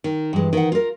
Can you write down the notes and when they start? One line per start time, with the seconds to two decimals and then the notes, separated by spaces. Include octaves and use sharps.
0.04 D#3
0.33 G2 E3 G#3
0.53 D#3 F#5
0.72 F4 A#4